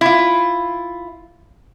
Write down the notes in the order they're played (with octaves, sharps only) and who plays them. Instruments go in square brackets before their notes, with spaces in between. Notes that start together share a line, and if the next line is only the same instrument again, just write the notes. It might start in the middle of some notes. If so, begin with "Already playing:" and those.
[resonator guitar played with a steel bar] E4 F4